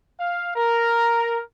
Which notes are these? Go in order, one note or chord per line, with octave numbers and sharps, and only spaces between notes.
F5
A#4